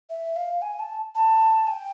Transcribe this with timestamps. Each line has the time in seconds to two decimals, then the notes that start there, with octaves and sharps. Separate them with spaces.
0.10 E5
0.36 F5
0.62 G#5
0.79 A5
1.15 A5
1.67 G#5
1.72 G5